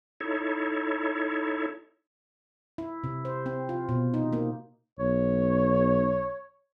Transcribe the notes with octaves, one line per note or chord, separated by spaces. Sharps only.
D#4 E4 A4 C#5
E4
C3
C5
C4
F4
B2
D#4
A#3
B1 C#5